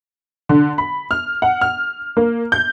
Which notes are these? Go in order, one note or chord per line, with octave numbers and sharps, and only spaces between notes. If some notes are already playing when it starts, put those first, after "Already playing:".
D3
B5
F6
F#5
F6
A#3
G6